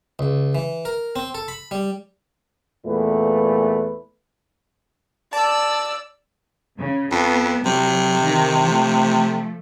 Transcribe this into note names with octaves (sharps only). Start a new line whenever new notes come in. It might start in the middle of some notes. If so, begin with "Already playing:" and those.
C#2
E3
A#4
C4
A4
B5
G3
E2 A#2 A3 B4
D5 A5 E6
C#3
F2 B3
C3 F#3
D#3
F3 A3